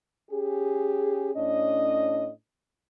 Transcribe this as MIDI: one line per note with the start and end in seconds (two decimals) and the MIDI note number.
0.30 1.30 61
0.30 1.30 67
0.30 1.30 68
1.35 2.29 45
1.35 2.29 61
1.35 2.29 62
1.35 2.29 75